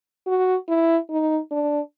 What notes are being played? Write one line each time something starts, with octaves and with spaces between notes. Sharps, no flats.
F#4
E4
D#4
D4